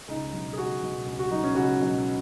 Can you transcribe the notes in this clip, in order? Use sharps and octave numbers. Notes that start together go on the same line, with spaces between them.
C#2 D#4
B2 F#3
G#4
C#2 F#4
B2 F#3
C#2
F#4
B2 F#3 D#4
C#4
C#2 F#4
B2 F#3